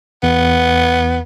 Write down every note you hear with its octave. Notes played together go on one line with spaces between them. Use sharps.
E2 B3